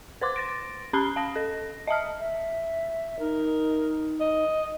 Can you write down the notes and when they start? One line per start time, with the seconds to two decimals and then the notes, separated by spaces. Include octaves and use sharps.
0.21 B4 C5 C6 D6
0.36 A6 A#6 D7
0.93 C#4 A5 B5 F#6 C7 G7
1.16 F5 A5 A#6
1.36 A4 A#6
1.87 D#5 E5 A5 F6
2.19 E5
3.19 D#4 A#4
4.20 D#5